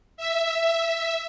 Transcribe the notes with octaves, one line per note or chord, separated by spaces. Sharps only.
E5